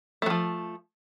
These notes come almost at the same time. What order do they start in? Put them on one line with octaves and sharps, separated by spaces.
A3 F#3 F3